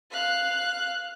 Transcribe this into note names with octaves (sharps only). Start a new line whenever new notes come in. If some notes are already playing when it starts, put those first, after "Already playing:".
F5 F#6